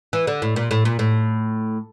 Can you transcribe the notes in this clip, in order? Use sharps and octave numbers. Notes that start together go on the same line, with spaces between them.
E3
D3
A2
A#2
A2
A#2
A2